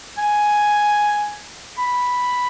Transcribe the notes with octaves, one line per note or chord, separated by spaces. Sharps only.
G#5
B5